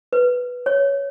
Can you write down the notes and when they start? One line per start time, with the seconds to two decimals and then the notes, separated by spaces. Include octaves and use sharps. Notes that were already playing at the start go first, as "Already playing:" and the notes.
0.13 B4
0.66 C#5